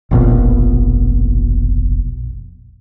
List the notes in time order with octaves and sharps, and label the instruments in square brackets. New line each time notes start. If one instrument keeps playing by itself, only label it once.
[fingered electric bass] F1 A#1 B2